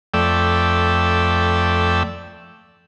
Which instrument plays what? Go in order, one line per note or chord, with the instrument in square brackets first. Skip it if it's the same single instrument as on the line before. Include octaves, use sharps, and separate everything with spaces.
[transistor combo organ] F2 A3 D5 G5 E6